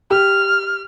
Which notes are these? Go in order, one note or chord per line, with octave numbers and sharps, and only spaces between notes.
G4 F6